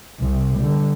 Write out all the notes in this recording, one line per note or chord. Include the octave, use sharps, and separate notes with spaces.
C2 C3
D3 G3